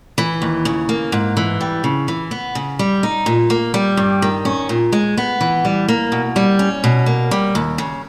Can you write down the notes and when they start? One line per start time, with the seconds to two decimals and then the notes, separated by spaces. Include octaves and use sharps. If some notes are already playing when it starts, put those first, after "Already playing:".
0.18 E3
0.42 D#2
0.65 C#3
0.89 A#3
1.12 G#2
1.37 E3
1.61 G3
1.84 C#3
2.08 E3
2.31 B3
2.55 C#3
2.79 G3
3.03 D#4
3.26 A#2
3.50 A#3
3.74 G3
3.97 G2
4.22 D#3
4.45 C#4
4.69 A#2
4.92 G#3
5.17 B3
5.41 E3
5.65 G3
5.88 A#3
6.12 B2
6.36 G3
6.59 C#4
6.84 B2
7.06 A#3
7.31 G3
7.55 D#2
7.78 C#3